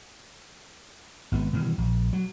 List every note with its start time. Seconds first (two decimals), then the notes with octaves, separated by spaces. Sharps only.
1.32 G#1 B3
1.53 B2 D#3 E3 G3
1.78 A#1
2.13 F#3